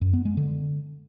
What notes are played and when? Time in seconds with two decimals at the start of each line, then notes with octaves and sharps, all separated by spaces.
0.01 F#2
0.13 B3
0.25 G#3
0.37 D3